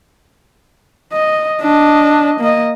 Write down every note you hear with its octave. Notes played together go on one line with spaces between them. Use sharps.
D#5
D4 D#5
A#3 D#5